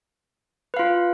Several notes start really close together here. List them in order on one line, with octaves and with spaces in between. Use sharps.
B4 F5 F4